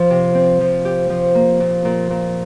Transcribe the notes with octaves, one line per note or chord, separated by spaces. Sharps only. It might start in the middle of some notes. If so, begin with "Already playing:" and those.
Already playing: F3
C3
C4
F3
G4
F3
A#3
A#2
A#2
A#2